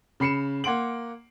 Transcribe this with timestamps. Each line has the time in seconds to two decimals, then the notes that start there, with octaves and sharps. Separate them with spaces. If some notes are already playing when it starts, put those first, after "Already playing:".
0.20 C#3 B5 C7 C#7 E7
0.64 A#3 F#5 C6 D7 F#7